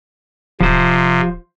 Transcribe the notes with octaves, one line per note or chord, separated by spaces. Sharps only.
D1 C3 F3 C5